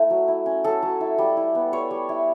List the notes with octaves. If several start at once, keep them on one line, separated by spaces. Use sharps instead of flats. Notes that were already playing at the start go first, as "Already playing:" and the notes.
Already playing: A3 E4
F#3
E4
C#4
F#3 A4
F#3
E4
G3
E4
B3
G3 C#5
G3
E4